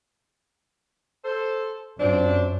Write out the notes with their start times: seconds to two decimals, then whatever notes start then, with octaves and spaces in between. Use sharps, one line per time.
1.24 A4 C5
2.00 F#2 F3 C4 D4